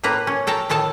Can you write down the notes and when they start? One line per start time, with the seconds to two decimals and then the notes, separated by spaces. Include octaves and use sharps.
0.03 A2 A#3 B4 A#5
0.27 C#4
0.47 A4 G5 A5 A#5
0.69 A2 D#3 A4 A5